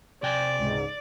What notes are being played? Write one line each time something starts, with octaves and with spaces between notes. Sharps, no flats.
C3 D5 G5 G#5
C#2 G#2